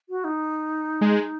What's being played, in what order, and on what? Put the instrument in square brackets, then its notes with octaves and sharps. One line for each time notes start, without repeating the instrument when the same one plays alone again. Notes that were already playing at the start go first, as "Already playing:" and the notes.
[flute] F#4
D#4
[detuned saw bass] G#3